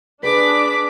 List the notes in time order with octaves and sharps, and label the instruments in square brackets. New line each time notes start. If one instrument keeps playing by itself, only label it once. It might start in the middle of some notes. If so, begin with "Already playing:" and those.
[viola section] D4 [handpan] G#4 B4 [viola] D5 D6 [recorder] B6